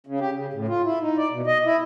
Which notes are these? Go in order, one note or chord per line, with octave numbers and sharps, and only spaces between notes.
C#3
G4
C#3
A2
F4
E4
D#4
D5
B2
D#5
E4